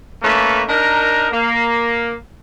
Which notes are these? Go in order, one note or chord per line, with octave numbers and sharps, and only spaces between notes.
A3 A#3 C#4 A4 B4
D4 D#4 A#4
A#3